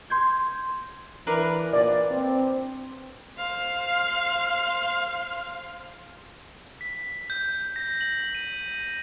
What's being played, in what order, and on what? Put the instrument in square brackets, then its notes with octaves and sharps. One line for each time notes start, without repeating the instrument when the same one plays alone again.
[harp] C6 G6 G#6
[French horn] E3 [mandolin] D4 A#4 B4
[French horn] A#2 [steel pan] D5
[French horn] C4
[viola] C5 F5
[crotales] B6
G6
A#6
F#7
D#7